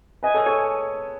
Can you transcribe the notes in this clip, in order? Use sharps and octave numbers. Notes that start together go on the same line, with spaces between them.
B4 D#5 G#5
A4 C#5
A4 C#5